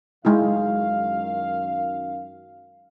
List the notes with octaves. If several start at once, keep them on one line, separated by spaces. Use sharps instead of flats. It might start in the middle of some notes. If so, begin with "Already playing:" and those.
F#2 D#3 G#3 D#4 E4 F5